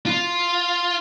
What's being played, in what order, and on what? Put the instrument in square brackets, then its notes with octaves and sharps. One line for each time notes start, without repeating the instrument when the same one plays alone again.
[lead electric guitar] F4